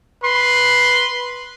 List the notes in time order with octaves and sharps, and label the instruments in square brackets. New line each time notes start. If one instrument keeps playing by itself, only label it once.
[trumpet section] B4 C6